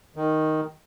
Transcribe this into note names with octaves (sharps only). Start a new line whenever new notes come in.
D#3